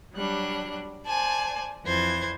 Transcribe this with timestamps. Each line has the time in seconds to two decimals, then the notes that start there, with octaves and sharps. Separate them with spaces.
0.14 F#3 G3 D4 F#6
1.06 C5 D5 G#5 A5
1.84 F2 E3 C5 G#6